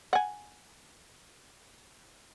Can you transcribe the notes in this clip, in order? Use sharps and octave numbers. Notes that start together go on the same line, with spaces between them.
F#5 G#5